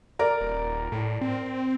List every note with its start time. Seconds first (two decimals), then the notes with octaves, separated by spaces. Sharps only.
0.19 A#4 D5 A#5
0.41 D#1
0.92 A2
1.21 C4